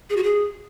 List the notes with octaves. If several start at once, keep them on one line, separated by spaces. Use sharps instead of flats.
G#4
F#4
G#4